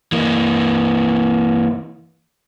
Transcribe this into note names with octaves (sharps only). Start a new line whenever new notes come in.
E3 A#3